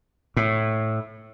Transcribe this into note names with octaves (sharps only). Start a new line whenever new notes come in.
A2